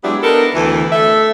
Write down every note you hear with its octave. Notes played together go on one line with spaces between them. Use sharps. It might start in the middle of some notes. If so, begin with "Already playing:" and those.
F#3 G#3 B3 D4 E4 G4
B3 D4 D#4 A4 A#4
D2 B2 D3 E3
A3 A4 E5